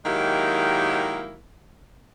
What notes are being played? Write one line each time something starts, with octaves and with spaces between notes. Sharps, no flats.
D#3 F#3 G#3 A#3 E4 G4